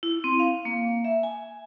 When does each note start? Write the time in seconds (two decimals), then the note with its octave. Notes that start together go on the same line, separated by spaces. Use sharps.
0.03 E4
0.24 C4
0.39 F5
0.65 A#3
1.04 E5
1.23 G#5